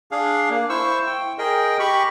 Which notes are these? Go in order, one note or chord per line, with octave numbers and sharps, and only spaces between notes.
D4 G#4 F5
A#3
E4 C5 C#6 E6
G5
G#4 A#4 D#5 G5
G4 B5 C#6